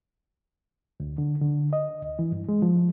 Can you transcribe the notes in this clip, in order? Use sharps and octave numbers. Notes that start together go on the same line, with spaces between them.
D2
D3
D3
D#5
D2
E3
G2
G#3
F3